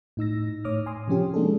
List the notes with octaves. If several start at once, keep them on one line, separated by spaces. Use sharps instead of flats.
A2 D#4 E6 A#6
A2 C#5 D6 D#6 F6
G#5 C6 D#6
C3 F3 C#4 G4
G#3 A#3 D4 D#4 G#4 A4